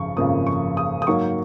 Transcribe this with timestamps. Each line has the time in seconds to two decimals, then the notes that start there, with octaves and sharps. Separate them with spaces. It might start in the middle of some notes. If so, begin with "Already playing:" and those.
Already playing: G#1 F#2 C#3 F3 C#6
0.17 G#1 F#2 C#3 F3 A#3 D#6
0.47 C#6
0.77 D#6
1.02 D#6
1.07 G#2 F#3 A#3 C#6